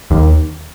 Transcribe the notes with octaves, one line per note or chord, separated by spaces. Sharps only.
D#2